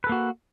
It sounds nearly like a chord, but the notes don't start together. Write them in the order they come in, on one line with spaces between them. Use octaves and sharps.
B4 A4 A#3 F#4